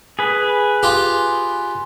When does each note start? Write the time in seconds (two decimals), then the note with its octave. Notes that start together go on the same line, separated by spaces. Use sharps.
0.19 G#4 B4
0.83 F4 G4